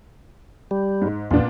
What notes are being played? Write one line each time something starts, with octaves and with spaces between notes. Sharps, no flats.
G3
G#2
E2 A#2 B3 D4